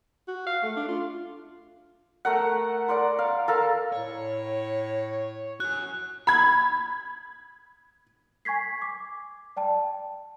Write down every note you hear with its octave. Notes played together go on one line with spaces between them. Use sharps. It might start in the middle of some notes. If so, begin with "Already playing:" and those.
F#4
F5
A3
D4
F4
A3 A#4 F#5
A#4 D5 F#5 C6
F5
A4 A#4 F5
A2 C#5
F#4 G#5 F#6
B5 G#6
G#5 C#6 G#6 B6 C7
D6
D5 G5 A5